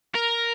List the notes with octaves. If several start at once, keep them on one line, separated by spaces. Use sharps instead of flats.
A#4